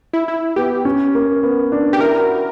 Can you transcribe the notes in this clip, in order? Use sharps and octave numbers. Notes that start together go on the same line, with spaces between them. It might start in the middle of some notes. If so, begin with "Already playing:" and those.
E4
E4
B3 G4
C#4
A#3
B3
D4
G4
E4 A#4
F#4